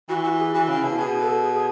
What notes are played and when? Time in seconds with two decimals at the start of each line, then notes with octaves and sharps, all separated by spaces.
0.09 E3 F#4
0.24 F#4
0.39 G#4
0.54 E3 F#4
0.69 C#3
0.77 E4
0.83 B2
0.98 B2 G#4
1.21 A4
1.43 G#4
1.55 G#4